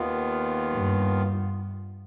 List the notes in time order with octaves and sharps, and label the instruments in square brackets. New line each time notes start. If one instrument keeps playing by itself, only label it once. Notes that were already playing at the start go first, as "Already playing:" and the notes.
Already playing: [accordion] D#2 D#3 B3 F4
[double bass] G2